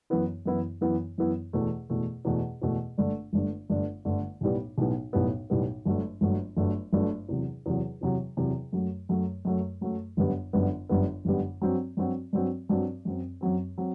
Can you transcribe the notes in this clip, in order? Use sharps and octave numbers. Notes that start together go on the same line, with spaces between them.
F#2 E3 B3 E4
F#2 E3 B3 E4
F#2 E3 B3 E4
F#2 E3 B3 E4
E2 B2 A3
E2 B2 A3
E2 B2 A3
E2 B2 A3
G1 G2 D3 A3 D4
G1 G2 D3 A3 D4
G1 G2 D3 A3 D4
G1 G2 D3 A3 D4
B1 A2 G3 B3
B1 A2 G3 B3
B1 A2 G3 B3
B1 A2 G3 B3
G1 G2 F#3 A3
G1 G2 F#3 A3
G1 G2 F#3 A3
G1 G2 F#3 A3
E2 C3 F#3
E2 C3 F#3
E2 C3 F#3
E2 C3 F#3
F#2 F#3 A3
F#2 F#3 A3
F#2 F#3 A3
F#2 F#3 A3
G1 F#2 D3 G3 B3
G1 F#2 D3 G3 B3
G1 F#2 D3 G3 B3
G1 F#2 D3 G3 B3
G2 F#3 C4 F#4
G2 F#3 C4 F#4
G2 F#3 C4 F#4
G2 F#3 C4 F#4
F#2 F#3 C4
F#2 F#3 C4
F#3 C4